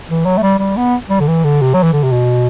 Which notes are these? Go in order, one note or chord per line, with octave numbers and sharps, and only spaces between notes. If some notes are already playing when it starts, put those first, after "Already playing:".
E3
F#3
A3
G3
G3
B3
G3
D3
E3
D3
C3
F#3
E3
D3
C3
B2